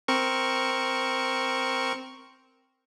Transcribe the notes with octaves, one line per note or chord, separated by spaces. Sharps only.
C4 A#4 C#6